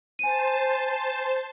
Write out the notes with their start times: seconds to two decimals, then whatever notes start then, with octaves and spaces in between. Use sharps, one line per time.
0.19 C5 G#5 A5 D#7